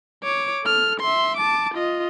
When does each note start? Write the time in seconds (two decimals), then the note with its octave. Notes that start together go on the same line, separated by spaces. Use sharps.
0.24 C#5 D6
0.64 A4 F6
1.00 E5 C6
1.37 A5 D6
1.75 F4 D#5